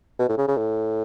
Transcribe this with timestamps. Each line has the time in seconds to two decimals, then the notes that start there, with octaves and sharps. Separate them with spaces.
0.19 B2
0.29 A2
0.38 C#3
0.48 C#3
0.57 A2